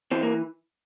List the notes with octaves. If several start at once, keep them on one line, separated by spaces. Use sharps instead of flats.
E3 C4
A#3